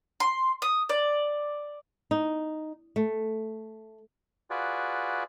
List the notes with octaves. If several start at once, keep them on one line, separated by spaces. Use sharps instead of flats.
C6
D#6
D5
D#4
A3
F4 F#4 G#4 B4 D5